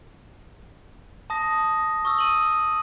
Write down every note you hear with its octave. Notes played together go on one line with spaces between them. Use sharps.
A5 D#6 A#6
C#6 D#6 E6
D#7 F#7